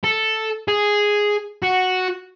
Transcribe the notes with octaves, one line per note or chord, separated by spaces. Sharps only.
A4
G#4
F#4